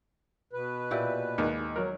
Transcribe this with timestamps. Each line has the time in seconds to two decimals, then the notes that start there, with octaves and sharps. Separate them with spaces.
0.53 B2 B4
0.91 A#2 E4 G4
1.38 D#2 G#3
1.76 F#3 A#4